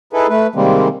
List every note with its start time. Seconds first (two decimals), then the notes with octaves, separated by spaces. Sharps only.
0.13 D#4 E4 G#4 A4 B4
0.29 A3 B4
0.55 C3 D#3 G3 G#3 A#3 C4